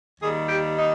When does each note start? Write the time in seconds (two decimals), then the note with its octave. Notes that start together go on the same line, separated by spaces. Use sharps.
0.20 D#2 D#3 G3 G#4
0.48 G4
0.75 D#4